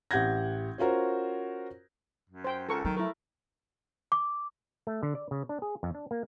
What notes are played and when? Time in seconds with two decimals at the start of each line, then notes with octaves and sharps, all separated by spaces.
0.11 A1 G4 F#5 G6 G#6 A#6
0.78 C#4 F4 F#4 A#4 C5
2.30 F#2
2.44 C5 G5
2.69 C#2 A4 A#4 C#6
2.85 D#3 F#3
2.97 A3 E4 A#4
4.12 D6
4.87 A3
5.03 D3
5.15 D5
5.31 C#3
5.49 D4
5.62 G#4
5.83 F2
5.95 D4
6.11 A#3